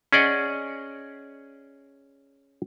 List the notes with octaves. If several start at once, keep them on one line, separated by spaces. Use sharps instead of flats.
C#4 G#4 D5 D#5 F#5